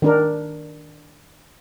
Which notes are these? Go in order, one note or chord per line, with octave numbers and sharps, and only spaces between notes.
D#3 D4 A#4